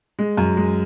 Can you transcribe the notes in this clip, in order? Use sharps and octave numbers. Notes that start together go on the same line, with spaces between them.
G#3
F#2
G#3